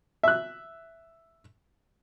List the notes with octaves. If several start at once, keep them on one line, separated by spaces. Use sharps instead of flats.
E5 F#6